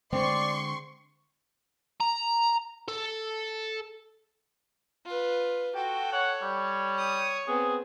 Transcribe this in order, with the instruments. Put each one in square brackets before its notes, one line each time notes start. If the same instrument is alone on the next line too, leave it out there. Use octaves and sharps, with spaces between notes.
[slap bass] D3 G#3 [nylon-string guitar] C4 [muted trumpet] D5 [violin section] C6 C#6
[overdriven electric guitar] A#5
A4
[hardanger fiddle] F4 B4
[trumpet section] F#4 [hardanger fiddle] A4 [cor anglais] G5
[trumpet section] C#5 [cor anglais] F#5
[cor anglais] G3
[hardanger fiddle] D#6
[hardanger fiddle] B3 C4 [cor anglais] G#4